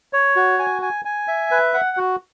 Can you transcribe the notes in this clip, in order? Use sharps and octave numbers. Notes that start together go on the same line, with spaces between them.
C#5
F#4
G#5
G#5
G#5
E5
B4
F#5
F#4